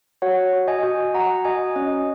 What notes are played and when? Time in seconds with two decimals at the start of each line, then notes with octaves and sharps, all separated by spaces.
0.22 F#4 C#5 F#5
0.53 F#4
0.67 D#5 G#5
0.83 F#4
1.14 F#4 F#5 A#5
1.45 F#4 D#5 G#5
1.76 C#4 D#5